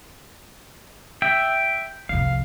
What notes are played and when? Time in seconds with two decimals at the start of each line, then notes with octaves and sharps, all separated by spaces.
1.22 E5 G5
2.09 C2 F2 F5